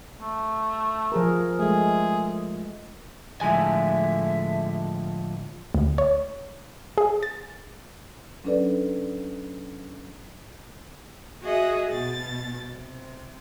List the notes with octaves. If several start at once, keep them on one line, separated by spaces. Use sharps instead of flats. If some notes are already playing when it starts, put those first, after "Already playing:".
A3
F3 G#4 A#4
G#3 A3 G#4
A2 D3 F3 G#3 E5 G#5
D2
C#5
G#4
A6
F#3 C#4 D4 A4 B4 D5
F#4 G#4 D#5 E5 F#5
B2 A6
C3